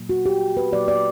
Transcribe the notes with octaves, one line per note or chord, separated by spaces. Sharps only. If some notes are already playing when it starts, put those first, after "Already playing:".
Already playing: A#2 F#3 A#3
F#4
G4
B4
A#2 F#3 A#3 D5
D5